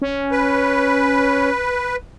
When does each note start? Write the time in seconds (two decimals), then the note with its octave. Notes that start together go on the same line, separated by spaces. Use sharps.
0.02 C#4
0.31 B4